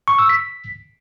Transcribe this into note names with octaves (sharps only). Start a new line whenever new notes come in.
C#6
E6
B6